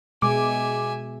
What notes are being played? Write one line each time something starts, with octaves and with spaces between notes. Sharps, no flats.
B2 G#3 E5 G#5 D6